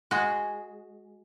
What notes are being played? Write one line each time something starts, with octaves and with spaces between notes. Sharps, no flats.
G#3 F#4